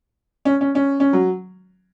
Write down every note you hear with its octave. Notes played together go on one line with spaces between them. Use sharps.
C#4
C#4
C#4
C#4
F#3